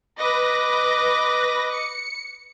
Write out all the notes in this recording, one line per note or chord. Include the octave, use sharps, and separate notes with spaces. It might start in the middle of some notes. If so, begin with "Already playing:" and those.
B4 D#5 D6 A#6
C#7